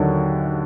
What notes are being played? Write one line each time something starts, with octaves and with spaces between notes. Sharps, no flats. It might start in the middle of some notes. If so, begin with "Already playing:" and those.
Already playing: D#2 D3 F#3